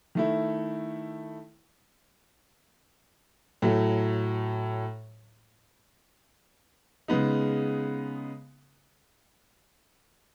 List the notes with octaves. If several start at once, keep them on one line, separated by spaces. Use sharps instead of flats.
D#3 A3 E4
A2 F#3 A3
C#3 G#3 B3 D#4